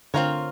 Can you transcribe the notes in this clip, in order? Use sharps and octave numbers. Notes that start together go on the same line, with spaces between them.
D3 C4 F4 A#4 C#5